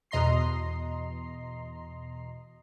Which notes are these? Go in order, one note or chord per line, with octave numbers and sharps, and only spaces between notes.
E2 B2 D#5 A#5 C6 C7